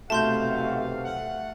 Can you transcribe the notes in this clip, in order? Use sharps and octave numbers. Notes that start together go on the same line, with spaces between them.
B1 C3 A3 F#4 F5 A5 C6 G6
F#5